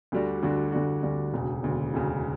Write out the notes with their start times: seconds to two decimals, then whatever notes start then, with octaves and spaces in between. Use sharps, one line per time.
0.12 D2 D3 G3 D4 F#4
0.43 D2 D3 G3 D4 F#4
0.72 D2 D3 G3 D4 F#4
1.03 D2 D3 G3 D4 F#4
1.33 E1 D2 C#3
1.63 E1 D2 C#3
1.94 E1 D2 C#3